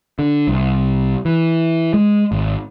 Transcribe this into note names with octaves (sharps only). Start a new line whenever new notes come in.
D3
C2
E3
G#3
G#1